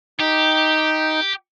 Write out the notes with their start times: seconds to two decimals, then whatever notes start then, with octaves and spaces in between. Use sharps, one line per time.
0.20 D#4 G4